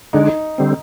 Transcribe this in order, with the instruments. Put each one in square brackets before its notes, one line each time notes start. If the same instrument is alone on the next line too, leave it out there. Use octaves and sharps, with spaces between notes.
[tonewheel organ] D3 G#3 D4 [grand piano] D#4
[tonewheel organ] D3 G3 C4